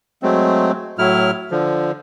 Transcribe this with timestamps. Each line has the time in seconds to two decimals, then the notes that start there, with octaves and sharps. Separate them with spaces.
0.23 F#3 G#3 A3 C4
0.99 A2 F#3 E4 F6
1.51 D3 F3